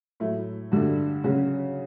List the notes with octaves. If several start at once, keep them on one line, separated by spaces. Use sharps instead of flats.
A2 F#3 A3 E4
G2 D3 A3 D4 F#4
C#3 F#3 C#4 F#4